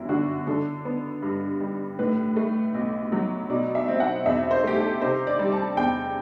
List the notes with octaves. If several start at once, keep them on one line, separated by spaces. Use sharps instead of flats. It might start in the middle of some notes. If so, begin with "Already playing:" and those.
Already playing: G1 F#2 G3 E4
D3 F#4
D3 A4
B3
G2
G3
A2 B4
A3
B1
F#3
B2 D5
E5
C4
F#5
E2 E5
C5
A3 G4
A4
C3 C5
D5
G3
A5
E2 G5